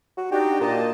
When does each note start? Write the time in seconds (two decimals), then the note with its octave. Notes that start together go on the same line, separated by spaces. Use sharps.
0.17 F#4
0.32 D4 D#4 F#4 G4
0.61 A#2 A#3 D#5 A5